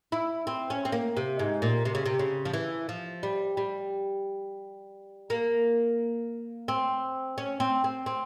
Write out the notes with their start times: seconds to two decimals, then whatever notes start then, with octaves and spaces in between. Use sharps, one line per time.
0.12 E4
0.47 C4
0.70 C#4
0.85 C4
0.92 A#3
1.17 C3
1.39 G#2
1.62 A#2
1.85 C3
1.95 C#3
2.06 C3
2.19 C#3
2.45 F3
2.54 E3
2.89 F3
3.23 G3
3.57 G3
5.30 A#3
6.68 C4
7.38 C#4
7.60 C4
7.84 C4
8.06 C4